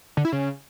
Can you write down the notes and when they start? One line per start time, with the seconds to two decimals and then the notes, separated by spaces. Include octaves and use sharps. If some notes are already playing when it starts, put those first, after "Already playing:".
0.17 D3
0.25 E4
0.32 C#3